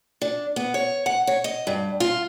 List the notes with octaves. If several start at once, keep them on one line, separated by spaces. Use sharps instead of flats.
D4
B3
C#5
F#5
C#5
D#5
G2
F4